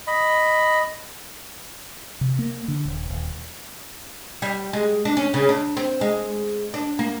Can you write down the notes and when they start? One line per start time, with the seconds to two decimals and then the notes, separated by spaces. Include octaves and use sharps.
0.07 D#5 B5
2.21 C3
2.39 A#3
2.68 D3
2.85 D#1
3.10 D#1
4.42 G3
4.73 G#3
5.05 D4
5.17 C#4
5.34 C#3
5.49 D4
5.77 C4
6.01 G#3
6.74 D4
6.99 A#3